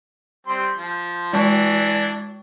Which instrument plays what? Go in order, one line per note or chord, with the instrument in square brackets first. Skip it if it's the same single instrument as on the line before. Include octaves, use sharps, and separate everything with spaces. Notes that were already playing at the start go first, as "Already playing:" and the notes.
[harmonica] G3 C4 C6
F3
[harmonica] E3 D4 [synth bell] G#3